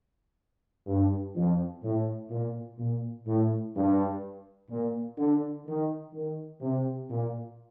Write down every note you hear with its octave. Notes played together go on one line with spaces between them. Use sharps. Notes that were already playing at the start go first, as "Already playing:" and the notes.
G2
F2
A2
A#2
A#2
A2
G2
A#2
D3
D#3
D#3
C3
A#2